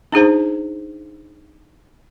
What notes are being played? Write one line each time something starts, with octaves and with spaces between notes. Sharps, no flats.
D4 D#4 G#4 C5